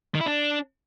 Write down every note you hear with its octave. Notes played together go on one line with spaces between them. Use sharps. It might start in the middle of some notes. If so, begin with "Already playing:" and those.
D#3
E4
D4